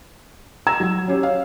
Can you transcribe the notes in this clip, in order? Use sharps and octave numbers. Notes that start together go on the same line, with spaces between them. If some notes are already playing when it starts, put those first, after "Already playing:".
A#5 E6 G#6 E7
F#3
C#4 G4 C#5
F5